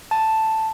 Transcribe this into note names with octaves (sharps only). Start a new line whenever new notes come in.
A5